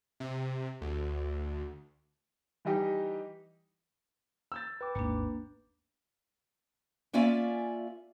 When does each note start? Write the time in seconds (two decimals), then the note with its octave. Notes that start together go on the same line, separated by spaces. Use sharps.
0.20 C3
0.81 D2
2.65 E3 G3 D#4 G4 D#5
4.52 E6 G6 A6
4.81 B4 G5 D6
4.95 G#1 D#2 A#3 D4
7.13 A#3 C#4 F4 D5 E5 G#5